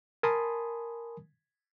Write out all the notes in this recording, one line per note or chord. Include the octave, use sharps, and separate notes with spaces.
A#4 G#5 A5 B5 C6 D#6